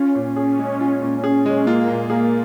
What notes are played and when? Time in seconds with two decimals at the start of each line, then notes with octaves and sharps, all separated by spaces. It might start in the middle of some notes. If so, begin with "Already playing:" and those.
Already playing: C#4 F4
0.15 A#2
0.36 G#4
0.59 G#3
0.81 F4
1.01 A#2
1.24 G#4
1.46 G#3
1.67 A#3 F4
1.88 A#2
2.10 A#3 G#4